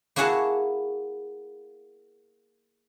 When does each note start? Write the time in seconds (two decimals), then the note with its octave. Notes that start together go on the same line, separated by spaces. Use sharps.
0.16 A#3 E4 F#4 G#4 F#5 A5